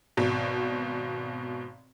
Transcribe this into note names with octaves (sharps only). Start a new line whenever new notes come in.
G#1 B2